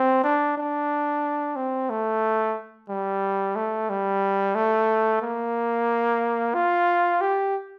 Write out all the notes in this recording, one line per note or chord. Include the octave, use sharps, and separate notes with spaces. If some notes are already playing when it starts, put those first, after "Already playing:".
Already playing: C4
D4
D4
C4
A3
G3
A3
G3
A3
A#3
F4
G4